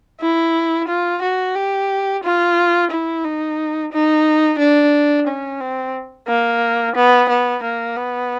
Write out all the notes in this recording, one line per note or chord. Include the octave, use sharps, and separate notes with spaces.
E4
F4
F#4
G4
F4
E4
D#4
D#4
D4
C#4
C4
A#3
B3
B3
A#3
B3